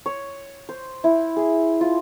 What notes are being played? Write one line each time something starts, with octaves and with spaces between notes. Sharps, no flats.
C#5
C5
E4
G#4
F4